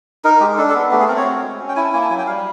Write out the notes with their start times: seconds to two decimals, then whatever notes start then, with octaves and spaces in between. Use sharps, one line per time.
0.24 D#4 A#4
0.40 G#3 G4
0.58 D4 A4
0.69 A4
0.75 B3
0.91 A3 G4
1.00 G#4
1.08 C4 A#4
1.17 C#5
1.25 F#4
1.42 G#3
1.59 C#4
1.68 G5
1.76 E4 G#5
1.84 A5
1.93 A#3 G#5
2.02 A5
2.10 F#3 G#5
2.18 G5
2.27 G3 F5